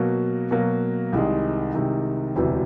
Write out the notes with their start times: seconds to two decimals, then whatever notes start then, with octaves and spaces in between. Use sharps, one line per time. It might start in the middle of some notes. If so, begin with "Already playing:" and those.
Already playing: B2 F#3 A#3
0.51 B2 F#3 A#3
1.13 C2 C3 D#3 G#3
1.73 C2 C3 D#3 G#3
2.36 E1 D2 C3 E3